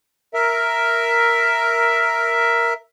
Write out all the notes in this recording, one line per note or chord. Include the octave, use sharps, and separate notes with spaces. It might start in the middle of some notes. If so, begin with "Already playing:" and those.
A#4 E5